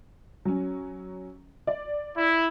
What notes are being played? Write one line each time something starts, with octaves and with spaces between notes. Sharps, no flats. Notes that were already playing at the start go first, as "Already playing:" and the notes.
F#3 C#4
D5
E4